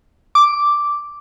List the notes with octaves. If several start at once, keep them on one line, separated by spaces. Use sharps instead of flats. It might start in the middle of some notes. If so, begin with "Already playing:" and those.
D6